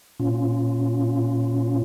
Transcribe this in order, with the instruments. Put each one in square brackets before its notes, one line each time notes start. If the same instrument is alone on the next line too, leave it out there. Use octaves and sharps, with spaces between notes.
[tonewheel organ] A#2 C#4 F4